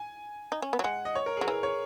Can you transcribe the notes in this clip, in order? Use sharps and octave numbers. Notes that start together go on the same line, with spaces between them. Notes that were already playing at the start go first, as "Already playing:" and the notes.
Already playing: G#5
D#4
C#4
B3
F#3
G#3 F#5
D#5
C#5
A#4
F#3 G#4
E3 A#4
C#5